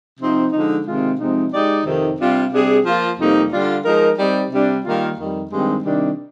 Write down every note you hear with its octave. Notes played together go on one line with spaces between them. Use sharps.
C3 F3 C4 D#4
D3 F3 G#3 D#4
C3 D#3 G#3 C4 F4
C3 F3 G#3 C4 D#4
G#3 D#4 G4 D5
F2 C3 D#3
C3 G3 D4 F4
C3 G3 D4 G#4
F3 A#3 F4
F2 C3 G3 A#3 D#4
D3 G3 D4 F4
F3 G#3 D#4 A#4
G3 C4 D#4 G4 D5
C3 G3 D4
D#3 G3 A#3 F4
F2 D#3 G3
G2 D#3 G#3 C4 G4
C3 D#3 G3 D4